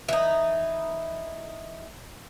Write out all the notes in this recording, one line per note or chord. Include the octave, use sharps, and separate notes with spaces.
E3 D#4